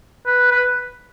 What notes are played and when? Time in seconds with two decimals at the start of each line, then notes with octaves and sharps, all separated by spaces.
0.26 B4
0.51 B4